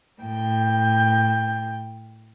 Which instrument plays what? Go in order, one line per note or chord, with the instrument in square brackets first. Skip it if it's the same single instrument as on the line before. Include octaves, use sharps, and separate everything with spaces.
[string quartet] A2 G5